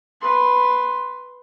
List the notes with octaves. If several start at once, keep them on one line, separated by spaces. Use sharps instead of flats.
B4 C6